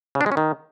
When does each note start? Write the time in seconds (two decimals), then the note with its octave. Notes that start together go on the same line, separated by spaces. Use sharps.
0.15 C#3
0.21 D4
0.26 G#3
0.32 C#4
0.37 D#3